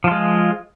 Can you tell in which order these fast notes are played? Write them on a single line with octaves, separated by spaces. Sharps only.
F3 F4 G#3